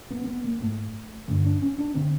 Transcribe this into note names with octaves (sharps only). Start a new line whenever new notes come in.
B3
C4
B3
A#3
G#2 A3
G2 D3 A3
D4
C#4
D4
D3 C4